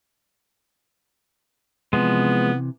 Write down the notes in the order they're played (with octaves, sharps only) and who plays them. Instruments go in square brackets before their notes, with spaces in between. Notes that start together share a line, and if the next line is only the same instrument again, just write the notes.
[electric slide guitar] C3 E3 [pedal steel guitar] F3 G#3 [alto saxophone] B3